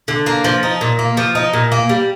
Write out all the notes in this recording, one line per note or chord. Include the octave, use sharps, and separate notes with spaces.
D3
A#3
F3
D#4
A#2
A#3
F3
D#4
A#2
A#3
G3